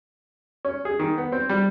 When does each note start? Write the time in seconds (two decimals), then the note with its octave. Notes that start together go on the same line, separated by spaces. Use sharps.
0.65 C#4
0.85 G#4
0.99 D#3
1.18 B3
1.32 C4
1.49 G3